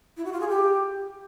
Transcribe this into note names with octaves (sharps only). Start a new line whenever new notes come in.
E4
F#4
F4
G#4
G4